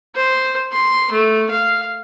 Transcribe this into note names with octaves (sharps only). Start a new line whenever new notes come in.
C5
C6
A3
F5